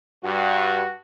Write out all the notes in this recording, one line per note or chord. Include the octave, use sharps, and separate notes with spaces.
G2 F#4